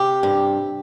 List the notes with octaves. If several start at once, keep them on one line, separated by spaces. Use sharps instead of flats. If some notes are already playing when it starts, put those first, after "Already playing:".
Already playing: C3 G4
G2